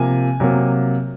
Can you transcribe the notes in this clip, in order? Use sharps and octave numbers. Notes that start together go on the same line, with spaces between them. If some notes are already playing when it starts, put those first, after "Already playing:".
Already playing: C3 F3 A#3 G#5
C3 F#3 A#3